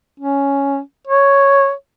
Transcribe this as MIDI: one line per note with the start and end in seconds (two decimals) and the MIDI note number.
0.20 0.80 61
1.07 1.72 73